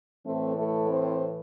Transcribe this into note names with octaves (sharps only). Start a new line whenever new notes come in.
A2 E3 A3 C4
A3 A4
C4 C5